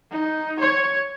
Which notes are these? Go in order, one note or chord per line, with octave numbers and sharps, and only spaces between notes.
D#4
C#5